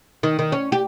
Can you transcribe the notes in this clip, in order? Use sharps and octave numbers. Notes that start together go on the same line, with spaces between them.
D#3
D#3
C#4
G4